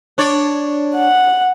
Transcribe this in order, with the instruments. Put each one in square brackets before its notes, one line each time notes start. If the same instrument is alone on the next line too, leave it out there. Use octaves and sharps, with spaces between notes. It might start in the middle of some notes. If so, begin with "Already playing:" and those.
[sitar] D4 C#5 D5
[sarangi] F#5